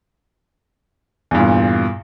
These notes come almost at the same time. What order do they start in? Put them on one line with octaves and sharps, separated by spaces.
E2 G2 A#2